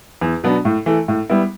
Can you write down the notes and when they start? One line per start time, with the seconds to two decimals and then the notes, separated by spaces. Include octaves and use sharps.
0.21 E2
0.44 B2 F#3 B3 D4
0.65 A2
0.86 E3 A3
1.08 A2
1.29 G3 B3 E4